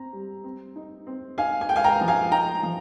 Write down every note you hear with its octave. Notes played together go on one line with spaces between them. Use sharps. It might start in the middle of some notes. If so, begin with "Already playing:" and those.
Already playing: C4 A#5
G3
C4
D#4
C4
D#4 F5 G#5
G#5
G#3 G5
F5 G#5
G5 A#5
F3
F5 G#5
D#4 G5 A#5
F3